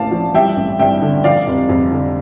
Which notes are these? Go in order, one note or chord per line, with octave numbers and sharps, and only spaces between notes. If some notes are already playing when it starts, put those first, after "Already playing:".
Already playing: A1 A2 A#3 D5 F5 A5
F3
G3 E5 G5
A1
G2 E5 G5
D3
F3 D5 F5
F1
F2
D3